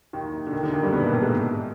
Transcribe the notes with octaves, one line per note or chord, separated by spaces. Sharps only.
D#2 D#3
D3
D#2 D#3
D#2 D#3
D3
D#2 D#3
G2 G3
B2 B3
A#2 A#3
A2 A3
G#2 G#3